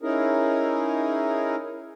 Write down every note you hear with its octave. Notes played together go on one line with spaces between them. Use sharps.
C#4 D#4 E4 G#4 A#4